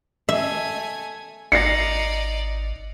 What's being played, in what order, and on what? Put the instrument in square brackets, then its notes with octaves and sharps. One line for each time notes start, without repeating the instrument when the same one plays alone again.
[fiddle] A3 G#5 [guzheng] E5
[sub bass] G#1 [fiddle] D#4 D5 [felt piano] A#6 C7 C#7